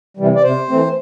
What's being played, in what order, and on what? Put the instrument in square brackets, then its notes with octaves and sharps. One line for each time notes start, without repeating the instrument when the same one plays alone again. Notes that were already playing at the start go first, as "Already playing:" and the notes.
[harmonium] C3 E3 G3
D5
C3 C5
E3 A3 C4